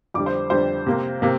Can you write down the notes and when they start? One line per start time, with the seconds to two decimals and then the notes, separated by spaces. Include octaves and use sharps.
0.14 F2 D3 G3 D6
0.26 C5
0.50 F2 D3 G3 C5
0.86 C3 A#3
1.22 C3 A#3